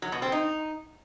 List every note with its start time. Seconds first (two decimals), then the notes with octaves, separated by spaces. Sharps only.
0.02 F#3
0.12 B2
0.22 C4
0.32 D#4